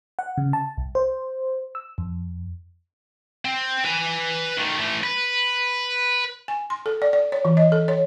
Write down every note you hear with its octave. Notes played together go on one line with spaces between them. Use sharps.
F#5
C#3
A5
C2
C5
E6
F2
C4
B4 G#5
D#3 A3
E3 A3
B4
G#5
C6
A4
D5
D5
C#5
E3
D#5
A4
C#5